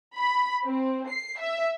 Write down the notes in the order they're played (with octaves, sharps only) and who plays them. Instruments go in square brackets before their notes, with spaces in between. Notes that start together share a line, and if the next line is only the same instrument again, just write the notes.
[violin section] B5
C4
C7
E5